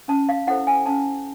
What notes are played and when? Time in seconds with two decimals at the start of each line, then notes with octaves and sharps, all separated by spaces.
0.08 C#4 A5
0.29 F5
0.47 E4 A4 C5 F#5
0.67 G#5
0.86 C#4 A5